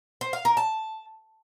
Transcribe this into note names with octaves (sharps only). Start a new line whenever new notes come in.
C5
F5
A#4
A5